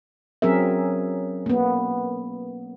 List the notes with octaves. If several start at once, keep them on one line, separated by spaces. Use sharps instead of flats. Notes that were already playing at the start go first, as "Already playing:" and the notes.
F#3 C4 C#4 G#4 A#4 E5
A#3 B3